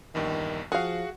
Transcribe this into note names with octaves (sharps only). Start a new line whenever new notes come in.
A#1 E2 G2 D#3
F3 F#4 G#4 F5 F#5